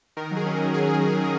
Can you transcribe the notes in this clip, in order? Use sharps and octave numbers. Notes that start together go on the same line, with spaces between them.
D#3 A#4
F#3
G#4
C#4
F#3 A#4
C#4 G#4